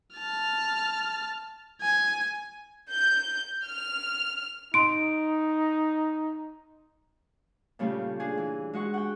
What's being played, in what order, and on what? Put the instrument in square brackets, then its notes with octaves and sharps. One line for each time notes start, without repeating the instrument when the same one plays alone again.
[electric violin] A5 F6
G#5
[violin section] G6
F6
[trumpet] D#4 [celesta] C6 D7
[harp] A#2 C#3 G3 A3 F4 G4
D4 G#4
E3
G#3 F#4 F#5 C#6
F#5 G5